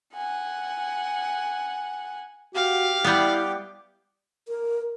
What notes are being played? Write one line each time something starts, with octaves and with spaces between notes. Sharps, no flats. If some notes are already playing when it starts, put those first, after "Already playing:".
F#5 G#5
F#4 G4 F5
G3 B3 E4
A#4